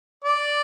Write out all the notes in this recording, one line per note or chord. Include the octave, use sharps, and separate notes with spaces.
D5